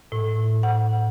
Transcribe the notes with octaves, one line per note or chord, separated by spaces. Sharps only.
A2
F#5